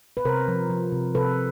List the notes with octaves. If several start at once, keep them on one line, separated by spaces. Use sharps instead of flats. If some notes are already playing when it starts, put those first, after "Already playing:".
B4
C3 A#4 C5
F3
F3
C3
C3 A4 B4